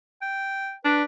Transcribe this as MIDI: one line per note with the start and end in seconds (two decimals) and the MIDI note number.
0.22 0.74 79
0.85 1.03 62
0.85 1.03 71